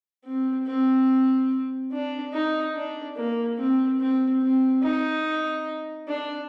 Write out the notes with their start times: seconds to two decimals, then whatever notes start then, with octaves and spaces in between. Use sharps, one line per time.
0.25 C4
0.67 C4
1.91 D4
2.33 D#4
2.74 D4
3.16 A#3
3.58 C4
3.99 C4
4.41 C4
4.83 D#4
6.07 D4